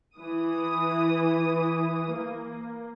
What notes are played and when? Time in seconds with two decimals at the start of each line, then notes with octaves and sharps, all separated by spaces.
0.16 E3 D#6
2.11 A#3